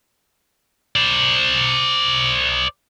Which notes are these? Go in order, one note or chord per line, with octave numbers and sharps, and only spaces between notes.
C5 D5